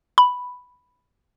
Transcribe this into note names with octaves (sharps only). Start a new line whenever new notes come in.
B5